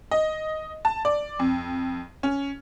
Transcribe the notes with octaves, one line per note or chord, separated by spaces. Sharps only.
D#5
A5
D5
F2
C#4